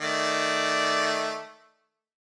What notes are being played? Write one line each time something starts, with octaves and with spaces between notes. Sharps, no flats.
D#3 A3 D5